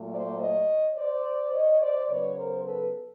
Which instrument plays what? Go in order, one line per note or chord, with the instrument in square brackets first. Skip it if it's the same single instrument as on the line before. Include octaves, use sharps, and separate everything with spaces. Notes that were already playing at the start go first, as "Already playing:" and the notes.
Already playing: [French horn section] A#2 F#3 A3
C5 D5
C#5 D#5
C5 D5
C#5 D#5
C5 D5
C#3 F#3 B3 B4 C#5
A#4 C5
A4 B4